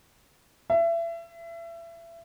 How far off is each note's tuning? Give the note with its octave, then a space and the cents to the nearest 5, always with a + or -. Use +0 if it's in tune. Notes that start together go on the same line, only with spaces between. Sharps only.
E5 +30